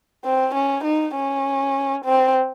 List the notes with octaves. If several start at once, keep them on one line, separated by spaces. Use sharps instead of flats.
C4
C#4
D#4
C#4
C4